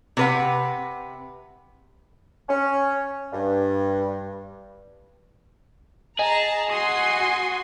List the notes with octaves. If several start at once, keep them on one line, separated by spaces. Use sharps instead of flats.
C3 B4 F#5
C#4
G2
G#4 D#5 A5 A#5
F#4 G#5 C6 D#6 C7